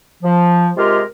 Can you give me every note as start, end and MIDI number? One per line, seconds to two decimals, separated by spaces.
0.23 0.69 53
0.77 1.01 48
0.77 1.01 56
0.77 1.01 65
0.77 1.01 67
0.77 1.01 68
0.77 1.01 70